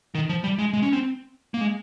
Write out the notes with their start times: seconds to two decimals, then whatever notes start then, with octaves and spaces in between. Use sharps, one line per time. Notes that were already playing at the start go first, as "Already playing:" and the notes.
0.15 D#3
0.29 F3
0.44 G3
0.58 G#3
0.73 G#3
0.82 C#4
0.93 C4
1.54 A#3
1.61 G#3